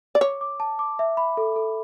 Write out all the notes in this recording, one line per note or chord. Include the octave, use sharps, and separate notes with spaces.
D5
C#5 D6
D6
A5
D6
E5
B5
A4
A4